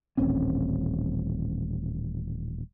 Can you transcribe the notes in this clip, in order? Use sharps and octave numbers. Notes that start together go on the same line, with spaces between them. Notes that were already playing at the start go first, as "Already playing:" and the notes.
D#1 A1 C4 C#4